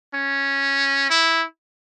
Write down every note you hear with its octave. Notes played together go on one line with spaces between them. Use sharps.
C#4
E4